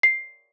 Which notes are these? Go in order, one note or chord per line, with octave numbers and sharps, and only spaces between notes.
C7